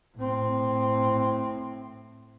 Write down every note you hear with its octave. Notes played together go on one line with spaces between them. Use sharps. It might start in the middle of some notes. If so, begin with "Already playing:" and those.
A2 C4